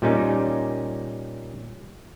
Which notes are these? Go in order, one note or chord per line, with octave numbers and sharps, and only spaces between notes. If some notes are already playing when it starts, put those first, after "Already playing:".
A#2 G3 C#4 D#4